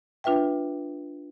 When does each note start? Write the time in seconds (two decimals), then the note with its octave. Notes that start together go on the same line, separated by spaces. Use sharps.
0.24 D4 F4 B4 E5 G5